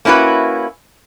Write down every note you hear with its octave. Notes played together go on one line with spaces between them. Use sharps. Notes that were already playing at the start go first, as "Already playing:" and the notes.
A#3 C#4 E4 F#4 B4